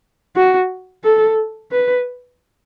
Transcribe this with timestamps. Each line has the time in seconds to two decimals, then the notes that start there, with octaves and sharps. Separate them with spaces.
0.36 F#4
1.04 A4
1.72 B4